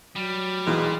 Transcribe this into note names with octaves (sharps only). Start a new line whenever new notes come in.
F#3 G3
B1 A#2 E3 G#3